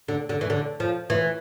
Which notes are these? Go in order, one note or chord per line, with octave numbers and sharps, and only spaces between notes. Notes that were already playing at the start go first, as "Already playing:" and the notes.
D3
D3
E3
D3
F3
E3